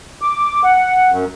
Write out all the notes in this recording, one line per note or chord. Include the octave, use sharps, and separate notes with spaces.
D6
F#5
F#2